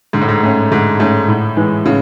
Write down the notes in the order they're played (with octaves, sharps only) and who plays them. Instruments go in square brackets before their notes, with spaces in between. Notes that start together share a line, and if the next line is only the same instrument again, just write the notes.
[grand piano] G#2 [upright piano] D3
[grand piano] A2
G#2
[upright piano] A3 C#4
[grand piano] G#2 [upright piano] D3
[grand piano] G#2 [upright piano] A3 C#4
[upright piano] A2
E3 G#3
[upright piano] A2 [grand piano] C#3